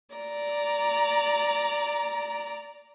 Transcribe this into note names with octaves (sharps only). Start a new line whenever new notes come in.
D5 A#5